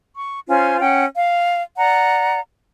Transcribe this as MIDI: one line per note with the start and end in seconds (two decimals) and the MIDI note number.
0.16 0.39 85
0.48 0.80 61
0.48 0.80 65
0.48 0.80 72
0.48 0.80 80
0.80 1.05 61
0.80 1.05 78
0.80 1.05 79
1.15 1.61 77
1.78 2.39 74
1.78 2.39 78
1.78 2.39 82